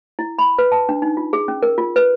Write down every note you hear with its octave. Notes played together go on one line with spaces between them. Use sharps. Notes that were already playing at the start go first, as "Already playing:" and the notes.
E4
B5
B4
A5
D4
D#4
F4
G#4
C#4
A#4
F4
B4